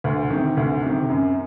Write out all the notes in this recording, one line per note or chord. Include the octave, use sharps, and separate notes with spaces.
D2
C3 D#3
D2
C3 D#3
F#2